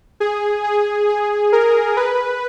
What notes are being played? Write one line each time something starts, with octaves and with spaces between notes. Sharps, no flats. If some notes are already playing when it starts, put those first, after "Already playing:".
G#4
G#4
G#4
A#4
B4